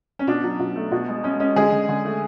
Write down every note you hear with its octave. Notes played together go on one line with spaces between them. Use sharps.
C#4
B2 D4
F#3
B2
A3
B2
G#3
G#3 C#4
G#3 C#4
D3 G#3 G#4
D3
D3
A3